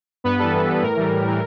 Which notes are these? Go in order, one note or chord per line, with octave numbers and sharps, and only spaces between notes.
G2 B3 B4
E3 G3 A4
G2
E3 G3
A2 A#4
E3 G3
A2
E3 G3